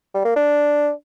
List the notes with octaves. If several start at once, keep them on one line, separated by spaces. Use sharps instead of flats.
G3
A#3
D4